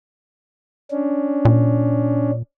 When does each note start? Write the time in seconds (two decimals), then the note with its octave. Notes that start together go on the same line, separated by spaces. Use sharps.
0.91 C#4 D4
1.45 A#2